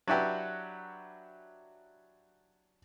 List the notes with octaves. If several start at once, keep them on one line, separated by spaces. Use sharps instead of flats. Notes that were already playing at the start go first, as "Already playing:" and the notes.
F#3 D4 E4 F#4 G4 B4